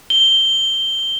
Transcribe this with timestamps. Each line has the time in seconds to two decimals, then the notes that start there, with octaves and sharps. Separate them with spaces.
0.10 G7